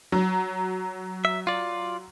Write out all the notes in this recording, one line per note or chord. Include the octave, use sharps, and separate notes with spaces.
F#3
E5
F4 D5